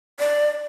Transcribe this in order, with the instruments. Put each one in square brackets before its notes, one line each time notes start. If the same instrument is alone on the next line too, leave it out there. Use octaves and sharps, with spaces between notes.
[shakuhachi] D5